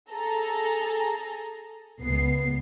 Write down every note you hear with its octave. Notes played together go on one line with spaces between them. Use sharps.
G#4 A4 A#5
C#2 B3 C7